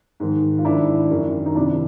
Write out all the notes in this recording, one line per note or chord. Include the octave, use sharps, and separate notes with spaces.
G#2 D#3
F4
G#2 D#3 D4 E4
F#2 D#3
D#4
F2 C3 D#3 D4 E4